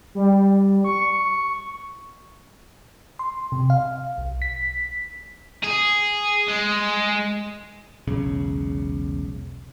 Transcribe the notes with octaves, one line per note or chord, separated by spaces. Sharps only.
G3
C#6
C6
C3
F5
B1
B6
G#4
G#3
E1 B1 C#3